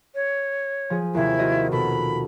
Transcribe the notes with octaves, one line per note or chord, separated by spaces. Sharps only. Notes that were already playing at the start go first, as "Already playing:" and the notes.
C#5
F3 G#4
D#2 C3 E4
F4 F#4 D#5
B2 A4 B5